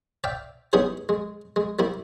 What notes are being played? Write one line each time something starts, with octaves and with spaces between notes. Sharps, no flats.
D5 E5 F5 G5
G3 B3 C#4 D#4 E4 G#4
G#3
G#3
G3 A#3 E4